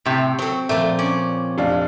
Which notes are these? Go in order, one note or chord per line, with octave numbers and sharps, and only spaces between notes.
A2 C3
F#3 C4 A4
A#2 F3 A3
C#4 D5
F1 D4 F5